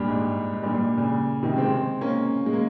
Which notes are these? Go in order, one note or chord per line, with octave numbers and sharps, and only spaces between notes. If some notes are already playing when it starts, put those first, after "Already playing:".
Already playing: G2 A#2
G#2
G#2
G2 A#2
G2 A#2
A#2 C#3
C3 D#3
G#3 C4
A#3 C#4
G#3
A#3